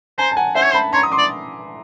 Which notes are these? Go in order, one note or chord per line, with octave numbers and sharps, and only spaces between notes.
C5 G#5 A#5
A5
F#5 G#5
C5 E5 F#5
C#5
C5
A5 B5
C#5 A#5 C6
D#6
C6 D6
D5